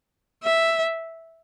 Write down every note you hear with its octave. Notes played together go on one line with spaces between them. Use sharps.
E5